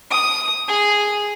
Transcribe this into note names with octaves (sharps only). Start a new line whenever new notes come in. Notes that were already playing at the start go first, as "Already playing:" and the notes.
D#6
G#4